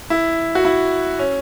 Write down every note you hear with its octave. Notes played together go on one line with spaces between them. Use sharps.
E4
F#4
E4
C#4